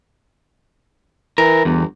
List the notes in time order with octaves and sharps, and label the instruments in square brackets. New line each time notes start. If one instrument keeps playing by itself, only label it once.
[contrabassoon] E3 [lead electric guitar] A#4
[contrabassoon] G1 [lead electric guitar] E2